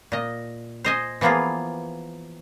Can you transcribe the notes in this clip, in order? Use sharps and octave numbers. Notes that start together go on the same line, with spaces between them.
A#2 D#5
C5 D#5 G#5
E3 F3 A#3 B3 F4 G#4